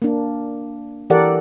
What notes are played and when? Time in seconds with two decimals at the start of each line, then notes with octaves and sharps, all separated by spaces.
0.02 A#3 D4
1.10 E3 G4 A4 A#4 D5 F#5